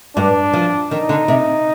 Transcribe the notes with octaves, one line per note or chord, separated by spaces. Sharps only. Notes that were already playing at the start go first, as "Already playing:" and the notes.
G2 D4
F3
D#3 D#4
D3
C3